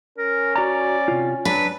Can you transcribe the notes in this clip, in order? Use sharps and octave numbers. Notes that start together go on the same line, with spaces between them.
C#4 A#4
F#4 D5 A#5
C3 F4
F#3 D4 B4